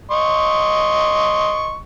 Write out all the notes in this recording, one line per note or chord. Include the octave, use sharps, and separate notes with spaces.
D#5 C6 C#6